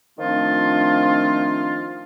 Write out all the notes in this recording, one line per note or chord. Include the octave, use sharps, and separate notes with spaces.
D#3 F3 A3 C4 D4 F4